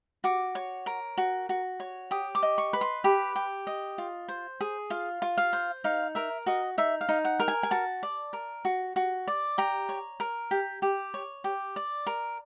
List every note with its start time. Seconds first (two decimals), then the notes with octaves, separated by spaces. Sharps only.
0.24 F#4 D6
0.55 C#5
0.86 A#4
1.18 F#4
1.49 F#4
1.80 C#5
2.11 G4 D#6
2.35 D6
2.43 D#5
2.58 C#6
2.73 B4
2.81 C6
3.04 G4 B5
3.36 G4
3.67 D#5
3.98 F4
4.28 C5
4.61 G#4
4.90 F4 F5
5.22 F4
5.38 F5
5.53 C5
5.84 D#4 F5
6.15 A#4 E5
6.46 F#4 D#5
6.78 D#4 E5
7.01 F5
7.09 D#4
7.25 F#5
7.40 A#4
7.48 G#5
7.63 G#5
7.71 F#4 A5
8.03 D5
8.33 A#4
8.65 F#4
8.96 F#4
9.28 D5
9.58 G4 A#5
9.89 C#5
10.20 A#4
10.51 G4
10.82 G4
11.14 C#5
11.44 G4
11.76 D5
12.07 A#4